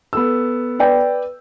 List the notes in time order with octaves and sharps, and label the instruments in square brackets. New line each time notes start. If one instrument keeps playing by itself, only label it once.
[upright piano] B3 A4 E6
[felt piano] B4 D5 G5